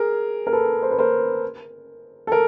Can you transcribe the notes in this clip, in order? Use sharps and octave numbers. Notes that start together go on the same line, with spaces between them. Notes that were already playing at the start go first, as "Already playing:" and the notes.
Already playing: G#4 A#4
A#4
A4 B4
C5
B4
A#4 C5
A4
A#4